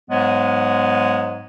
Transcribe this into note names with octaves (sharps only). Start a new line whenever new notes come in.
G#2 F#3 G#3 B3